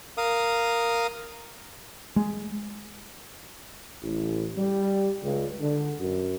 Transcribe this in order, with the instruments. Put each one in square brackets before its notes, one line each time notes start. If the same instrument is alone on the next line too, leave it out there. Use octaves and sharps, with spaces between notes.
[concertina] A#4 F5 D#6
[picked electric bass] G#3
[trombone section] A1
G3
C#2
D3
F#2